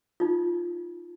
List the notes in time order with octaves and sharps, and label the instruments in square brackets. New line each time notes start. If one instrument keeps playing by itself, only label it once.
[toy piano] D#4 F4